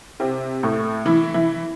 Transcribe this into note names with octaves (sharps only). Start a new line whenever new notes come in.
C3 C4
A2 A3
E3 E4
E3 E4